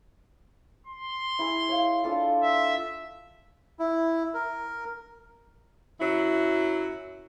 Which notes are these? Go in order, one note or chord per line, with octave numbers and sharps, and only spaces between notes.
C6
E4 G#4
C#5 F5
D4 F4 A4
E5
E4
A#4
F#2 F#3 E4